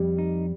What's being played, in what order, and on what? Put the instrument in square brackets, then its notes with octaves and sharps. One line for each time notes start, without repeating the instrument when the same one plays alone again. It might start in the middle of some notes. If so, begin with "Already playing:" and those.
Already playing: [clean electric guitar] F2 [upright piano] G3
[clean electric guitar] D#4